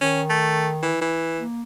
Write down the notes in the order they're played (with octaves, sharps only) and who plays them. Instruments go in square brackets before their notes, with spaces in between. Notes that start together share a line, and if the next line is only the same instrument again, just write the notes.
[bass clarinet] D#3 [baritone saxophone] C#4
[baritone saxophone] A3
E3
E3
[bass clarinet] A#3